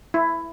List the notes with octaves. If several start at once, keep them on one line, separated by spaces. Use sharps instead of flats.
E4